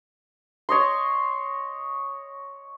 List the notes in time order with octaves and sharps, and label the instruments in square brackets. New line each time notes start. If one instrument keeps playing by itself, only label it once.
[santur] C#5 D#5 C6